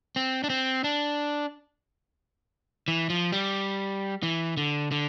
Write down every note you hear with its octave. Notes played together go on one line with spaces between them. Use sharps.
C4
D4
C4
D4
E3
F3
G3
E3
D3
D3